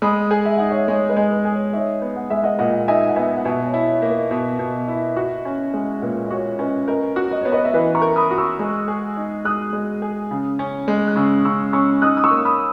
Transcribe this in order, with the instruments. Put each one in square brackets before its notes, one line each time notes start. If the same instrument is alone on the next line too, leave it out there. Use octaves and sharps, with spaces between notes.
[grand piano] G#3 [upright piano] B5 D#6
[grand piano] G#4
[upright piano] E5
[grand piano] D#4 [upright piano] F#5
[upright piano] C#5 E5
[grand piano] G#3 [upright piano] C#5
[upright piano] B4 D#5
[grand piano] G#3
[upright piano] B4
[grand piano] G#4
[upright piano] C#5
[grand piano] D#4 [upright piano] C#5 E5
[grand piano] B3
[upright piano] F#5
[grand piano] G#3 [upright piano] E5
[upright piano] D#5 F#5
[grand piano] A#2 [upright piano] D#5 F#5
[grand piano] D#4 [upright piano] E5 G#5
[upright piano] F#5
[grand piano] B3 [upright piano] E5 G#5
[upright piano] F#5
[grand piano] B2 [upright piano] E5 G#5
[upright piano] C#5
[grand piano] E4
[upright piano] C#5
[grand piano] A#3
[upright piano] B4 D#5
[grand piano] B2
B2
E4
F#4
C#4
G#3
[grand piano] A#2 [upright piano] B4
[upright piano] D#5
[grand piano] F#4 [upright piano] C#5
[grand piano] C#4 [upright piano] B4 D#5
[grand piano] A#4 [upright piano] B4 D#5
[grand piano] F#4
[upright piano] D#5
[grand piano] B3 [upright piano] C#5
[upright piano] B4 D#5
E5
[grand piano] E3 [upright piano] B4 D#5
[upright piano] A#5 C#6
[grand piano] A#4
[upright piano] B5 D#6
[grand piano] F#4
[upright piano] C#6 E6
[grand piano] G#3
G#4
D#4
[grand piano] G#3 [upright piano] D#6 F#6
[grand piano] G#3
G#4
C#3
C#4
G#3
[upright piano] F#6
[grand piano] C#3 [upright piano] C#6 E6
[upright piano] D#6
[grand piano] C#3 [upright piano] C#6 E6
[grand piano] C#4 [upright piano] C#6 E6
[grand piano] D#4 [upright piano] D#6 F#6
[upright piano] D#6
C#6 E6
[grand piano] A#3
[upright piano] B5 D#6